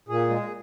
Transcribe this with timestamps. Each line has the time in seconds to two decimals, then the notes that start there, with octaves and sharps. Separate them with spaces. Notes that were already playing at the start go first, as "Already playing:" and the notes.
0.08 A#2 G#4
0.29 G#3